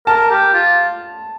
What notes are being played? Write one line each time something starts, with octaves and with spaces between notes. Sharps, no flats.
A#4 A5
G4
F4